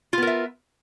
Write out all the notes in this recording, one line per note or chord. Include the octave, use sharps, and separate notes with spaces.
B3 F4 A#4 E5